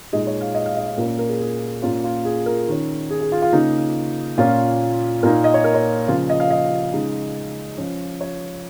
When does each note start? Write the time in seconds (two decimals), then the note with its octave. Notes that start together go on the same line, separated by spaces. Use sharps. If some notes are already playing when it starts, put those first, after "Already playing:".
0.12 A#2 G#3 D#4 D#5
0.27 C#5
0.41 F5
0.54 D#5
0.66 F5
0.77 D#5
0.87 D#5
0.98 A#2 A#3 C#4 A#4
1.19 A#4
1.29 G#4
1.40 G#4
1.82 A#2 A#3 C#4 F4
2.04 F4
2.25 G#4
2.46 A#4
2.68 D#3 C#4
3.11 G#4
3.21 G#4
3.32 F4
3.42 F4
3.53 C#3 A#3 D#4
4.38 A#2 A#3 C#4 F4
5.23 A#2 A#3 D#4 A#4
5.44 D#5
5.54 C#5
5.64 A#4
5.75 C#5
6.08 C#3 F3 A#3 F4
6.29 D#5
6.40 F5
6.51 D#5
6.93 C#3 G#3 D#4
7.78 F3 C#4
8.21 C#5